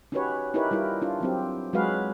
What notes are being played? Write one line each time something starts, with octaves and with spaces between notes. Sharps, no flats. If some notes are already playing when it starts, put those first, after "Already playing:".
C#4 D#4 F#4 G4 B4 C#5
D#4 E4 G4 A#4 B4 C#5
G3 E4 F4 A#4
D4 F4
F#3 C4 G4
F#3 G#3 F#4 G#4 B4 F5